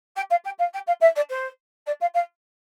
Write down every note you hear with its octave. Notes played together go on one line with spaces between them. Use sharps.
G5
F5
G5
F5
G5
F5
E5
D5
C5
D5
F5
F5